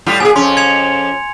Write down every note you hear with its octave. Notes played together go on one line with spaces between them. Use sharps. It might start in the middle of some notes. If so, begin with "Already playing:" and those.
A2 G3 F4
A#2 G4 G#4 G#5
F2 C#4 C6
G#6 C#7 F7